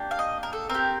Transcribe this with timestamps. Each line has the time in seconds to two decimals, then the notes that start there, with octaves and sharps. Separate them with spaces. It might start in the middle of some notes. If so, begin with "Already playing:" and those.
Already playing: A#3 D4 G4
0.11 F5
0.19 D#5
0.43 A#4
0.53 A4
0.69 C4 G4 A#4